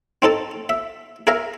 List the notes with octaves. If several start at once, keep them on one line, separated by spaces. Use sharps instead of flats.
C4 D#4 A4 A5
E5
G#4 A#4 E5 F5 A#5